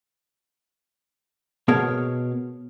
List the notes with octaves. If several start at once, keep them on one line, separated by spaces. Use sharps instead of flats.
B2 B3 G#4 A#4 C#5 A5